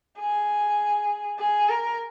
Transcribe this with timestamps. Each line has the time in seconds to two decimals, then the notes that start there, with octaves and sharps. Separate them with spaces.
0.19 G#4
1.39 G#4
1.69 A#4